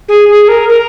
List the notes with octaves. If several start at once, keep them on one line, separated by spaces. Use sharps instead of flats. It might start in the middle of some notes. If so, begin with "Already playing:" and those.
G#4
G#4
A#4
A#4